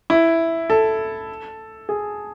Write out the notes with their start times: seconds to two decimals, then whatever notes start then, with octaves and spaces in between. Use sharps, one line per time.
0.10 E4
0.70 A4
1.89 G#4